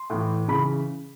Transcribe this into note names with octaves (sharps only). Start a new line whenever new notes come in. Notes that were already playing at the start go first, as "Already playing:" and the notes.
Already playing: C6
A2 E3
C#3 E3 B5